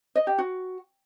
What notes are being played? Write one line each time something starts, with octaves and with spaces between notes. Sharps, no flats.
D#5
G4
F#4